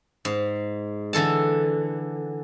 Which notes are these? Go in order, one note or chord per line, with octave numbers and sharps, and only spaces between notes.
G#2
D3 E3 A4 A5